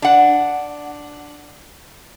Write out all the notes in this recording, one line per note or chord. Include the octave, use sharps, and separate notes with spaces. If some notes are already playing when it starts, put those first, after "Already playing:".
D4 F#5